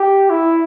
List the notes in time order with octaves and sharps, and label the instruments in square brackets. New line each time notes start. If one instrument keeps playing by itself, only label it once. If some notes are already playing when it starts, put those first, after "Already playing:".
Already playing: [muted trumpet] G4
E4